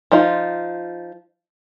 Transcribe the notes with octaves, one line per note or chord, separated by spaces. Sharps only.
F3 D#4 F4